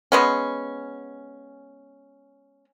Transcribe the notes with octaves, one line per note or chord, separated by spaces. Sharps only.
G#3 B3 C#4